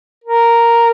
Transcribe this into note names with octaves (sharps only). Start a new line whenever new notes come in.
A#4